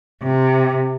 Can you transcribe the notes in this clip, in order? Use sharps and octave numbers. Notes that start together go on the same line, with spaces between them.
C3